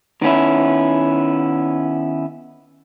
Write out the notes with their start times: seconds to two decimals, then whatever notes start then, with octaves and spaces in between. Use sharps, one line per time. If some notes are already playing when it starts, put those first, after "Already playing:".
0.22 D#3 B3 C#4 E4